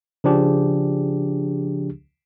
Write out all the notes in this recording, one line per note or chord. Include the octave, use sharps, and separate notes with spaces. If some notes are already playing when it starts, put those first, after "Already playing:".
C#3 F3 D4 G4 G#4